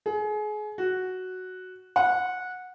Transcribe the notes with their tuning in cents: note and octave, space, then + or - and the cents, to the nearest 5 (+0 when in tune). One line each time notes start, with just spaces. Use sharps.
G#4 +30
F#4 +0
F#5 -15